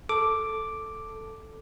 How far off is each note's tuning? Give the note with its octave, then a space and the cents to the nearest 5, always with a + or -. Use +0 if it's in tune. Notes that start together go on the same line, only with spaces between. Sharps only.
A4 +0 D6 +0